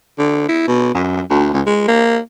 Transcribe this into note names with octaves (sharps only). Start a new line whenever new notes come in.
D3
E4
B2
F#2
D2
C#2
G#3
A#3